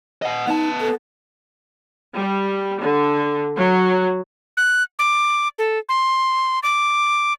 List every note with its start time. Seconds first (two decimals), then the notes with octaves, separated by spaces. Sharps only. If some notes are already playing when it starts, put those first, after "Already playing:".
0.22 D#5 F#5
0.47 B3 D#4 A5
0.80 A4
2.16 G3
2.81 D3
3.56 F#3
4.57 F#6
4.99 D6
5.58 A4
5.89 C6
6.63 D6